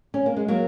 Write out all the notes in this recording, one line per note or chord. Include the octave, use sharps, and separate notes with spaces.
C#4
A#3
G#3
F#3 A#3